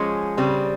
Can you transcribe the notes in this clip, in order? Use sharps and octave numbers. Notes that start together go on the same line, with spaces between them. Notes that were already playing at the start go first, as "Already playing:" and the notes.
Already playing: F3 G#3 C#4
C#3 G3 C4